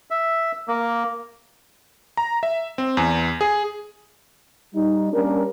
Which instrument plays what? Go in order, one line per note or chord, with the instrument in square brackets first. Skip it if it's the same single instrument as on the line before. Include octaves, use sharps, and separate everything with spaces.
[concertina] E5
A#3
[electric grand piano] A#5
E5
C4
E2
G#4
[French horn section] G3 D#4
G3 A#3 C#4 D4 A#4